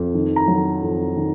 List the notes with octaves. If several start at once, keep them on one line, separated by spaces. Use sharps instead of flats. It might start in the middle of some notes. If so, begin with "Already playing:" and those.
Already playing: F2
D#3
A#5
F#3
F2
D#3